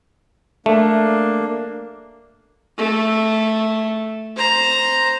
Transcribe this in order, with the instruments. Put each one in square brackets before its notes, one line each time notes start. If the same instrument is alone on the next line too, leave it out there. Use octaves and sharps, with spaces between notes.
[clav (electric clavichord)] A3 [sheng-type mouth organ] A#3 D4
[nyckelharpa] A3
C5 A#5